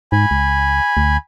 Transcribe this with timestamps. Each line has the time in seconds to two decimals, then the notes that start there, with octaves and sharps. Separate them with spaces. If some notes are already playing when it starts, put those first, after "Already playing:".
0.12 G#2 G#5 B5
0.31 C#2
0.97 D2